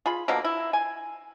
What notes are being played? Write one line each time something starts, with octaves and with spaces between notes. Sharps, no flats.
F4 G#4 B5
B2 D3 F3 A#3
E4
G#5